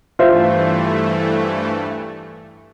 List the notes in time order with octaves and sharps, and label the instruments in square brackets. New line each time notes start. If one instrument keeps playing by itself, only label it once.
[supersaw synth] G2 E3 A3 [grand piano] F4 C5 E5